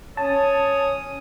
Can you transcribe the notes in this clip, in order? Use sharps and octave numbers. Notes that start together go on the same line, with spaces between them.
C#4 C#5 A5 D#6